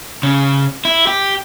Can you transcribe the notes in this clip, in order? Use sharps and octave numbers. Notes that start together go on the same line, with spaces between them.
C#3
E4
G4